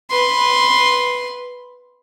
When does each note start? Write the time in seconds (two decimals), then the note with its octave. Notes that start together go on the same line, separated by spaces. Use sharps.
0.10 B4 C6